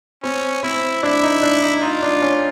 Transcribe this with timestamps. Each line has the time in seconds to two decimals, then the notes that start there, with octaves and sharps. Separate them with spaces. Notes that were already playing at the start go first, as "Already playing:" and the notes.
0.23 C4 C#4
0.63 C4 E4
1.03 D4 E4
1.23 D#4
1.42 D4
1.62 D#4
1.82 D#4 F4
2.02 D4
2.22 C#4